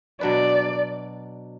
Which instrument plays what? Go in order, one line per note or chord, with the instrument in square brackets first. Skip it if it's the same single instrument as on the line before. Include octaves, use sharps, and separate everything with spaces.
[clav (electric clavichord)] B2 F#3 D4 B4 [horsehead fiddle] D5